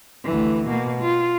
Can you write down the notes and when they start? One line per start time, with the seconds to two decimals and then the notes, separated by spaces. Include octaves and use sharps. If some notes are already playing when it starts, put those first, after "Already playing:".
0.24 D2 E3
0.68 B2 A#3
1.01 F4